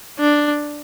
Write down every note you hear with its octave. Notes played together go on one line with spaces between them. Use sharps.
D4